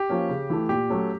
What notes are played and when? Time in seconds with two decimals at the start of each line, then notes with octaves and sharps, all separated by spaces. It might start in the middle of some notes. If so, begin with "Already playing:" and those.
Already playing: G4
0.09 F3 A#3 C#4
0.29 C#3
0.50 E3 A3
0.69 A#2 G4
0.89 F#3 A3 C#4